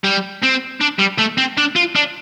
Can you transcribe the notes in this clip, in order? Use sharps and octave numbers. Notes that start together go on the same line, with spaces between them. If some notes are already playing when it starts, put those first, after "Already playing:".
G3
C4
D4
G3
A3
C4
D4
F4
D4